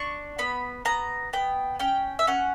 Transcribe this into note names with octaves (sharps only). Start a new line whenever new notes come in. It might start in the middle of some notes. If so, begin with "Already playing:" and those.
Already playing: D4 C#6
B3 B5
B3 A#5
B3 G5
C#4 G5
E5
C#4 F#5